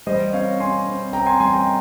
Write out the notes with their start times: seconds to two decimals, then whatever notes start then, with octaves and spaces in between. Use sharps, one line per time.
0.07 G3 C5 D#5
0.33 C4 C#5 F5
0.60 C4 G#5 C6
0.86 C4
1.13 C4 G5 A#5
1.26 G#5 C6
1.40 G3 G#5 C6
1.53 G5 A#5